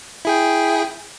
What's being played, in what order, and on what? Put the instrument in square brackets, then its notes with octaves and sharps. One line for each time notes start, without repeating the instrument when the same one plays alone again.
[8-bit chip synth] E4 G#4 G5